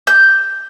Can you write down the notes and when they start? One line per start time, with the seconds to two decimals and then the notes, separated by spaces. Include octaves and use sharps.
0.07 G6